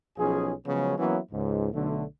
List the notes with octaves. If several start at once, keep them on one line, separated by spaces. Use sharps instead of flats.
B1 F3 C#4 F4 G#4
C#3 F3 F#3 G#3 B3 C#4
E3 F#3 A#3 B3 C#4 E4
C#2 G#2
B1 D3 A3